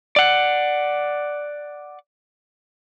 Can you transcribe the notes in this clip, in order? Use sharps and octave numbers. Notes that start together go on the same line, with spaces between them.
D5 F#5